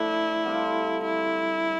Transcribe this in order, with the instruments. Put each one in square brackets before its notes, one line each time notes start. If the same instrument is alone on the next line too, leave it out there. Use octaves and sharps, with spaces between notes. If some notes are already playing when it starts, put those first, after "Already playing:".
Already playing: [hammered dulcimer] F3 A3 D4 [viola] E4
[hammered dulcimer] D3 G3 C4 F4
[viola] E4